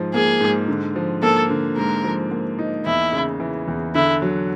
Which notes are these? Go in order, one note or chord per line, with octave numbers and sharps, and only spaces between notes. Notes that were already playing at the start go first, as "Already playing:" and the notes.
Already playing: G#2 F3
A#3 G#4
G#2
D3
F3
A#3 A4
D3
G#2 A#4
F3
A#3
D#4
E2 E4
C#3
E3
E2
D3 E4
F#3